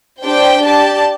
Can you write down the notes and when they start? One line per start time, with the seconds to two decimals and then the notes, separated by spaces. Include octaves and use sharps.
0.24 D4 G4 C5 G5
0.62 G4 D5 A5